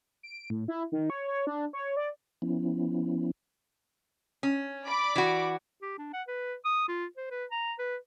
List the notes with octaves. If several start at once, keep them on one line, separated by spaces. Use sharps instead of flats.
D7
A2
E4
D#3
C#5
C#5
D4
C#5
D5
F3 B3 C#4 E4
C#4
D5 B5 D6
E3 F#4
G4
D4
F#5
B4
D#6
F4
C5
B4
A#5
B4